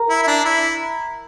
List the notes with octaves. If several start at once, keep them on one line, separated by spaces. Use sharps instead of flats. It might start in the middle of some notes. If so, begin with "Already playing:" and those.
Already playing: A#4
E4
E4
D4
E4